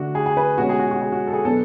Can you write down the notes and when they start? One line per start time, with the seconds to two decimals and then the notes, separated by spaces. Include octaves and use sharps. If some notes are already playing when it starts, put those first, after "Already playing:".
Already playing: D3 A3 D4 F#4
0.15 G#4
0.26 G#4
0.37 B4
0.58 B2 G#3 C#4 F#4
0.69 G#4
0.79 F#4
0.91 F#4
1.02 G#4
1.12 F#4
1.27 A4
1.33 G#4
1.45 B2 F#3 B3 D4 A4